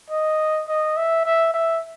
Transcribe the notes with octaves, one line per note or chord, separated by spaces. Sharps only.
D#5
D#5
E5
E5
E5